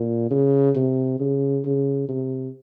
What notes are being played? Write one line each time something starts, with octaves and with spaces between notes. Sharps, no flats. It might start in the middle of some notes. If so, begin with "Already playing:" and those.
Already playing: A#2
C#3
C3
C#3
C#3
C3